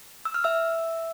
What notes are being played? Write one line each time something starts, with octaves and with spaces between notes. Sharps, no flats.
E6
F6
E5 E6